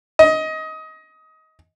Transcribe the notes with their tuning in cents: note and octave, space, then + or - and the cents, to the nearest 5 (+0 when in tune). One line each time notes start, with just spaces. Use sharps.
D#5 +20